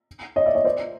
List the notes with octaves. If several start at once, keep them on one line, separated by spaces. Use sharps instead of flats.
C#5 D#5
D5 E5
C#5 D#5
C5 D5